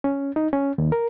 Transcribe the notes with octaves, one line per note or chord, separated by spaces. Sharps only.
C#4
D#4
C#4
D#2
A#4